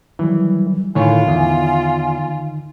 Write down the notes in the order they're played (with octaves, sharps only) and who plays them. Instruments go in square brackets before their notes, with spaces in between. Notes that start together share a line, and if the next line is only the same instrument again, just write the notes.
[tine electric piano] D#3 F#3 G3 [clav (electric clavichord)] E3
[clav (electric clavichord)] A2 C#5 [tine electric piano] D3 D#3 D#4 [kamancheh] F4 [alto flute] G#5
[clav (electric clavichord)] E2